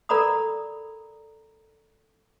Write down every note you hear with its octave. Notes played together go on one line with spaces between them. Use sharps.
A4 A#4 D5 A#5 B5 D#6